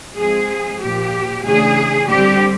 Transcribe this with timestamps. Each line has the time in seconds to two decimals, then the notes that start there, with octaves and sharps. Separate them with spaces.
0.18 F3 G#3 C4 G#4
0.82 A#2 F3 A#3 G4
1.45 C#3 E3 A3 D4 G#4
2.10 D3 G3 C4 G4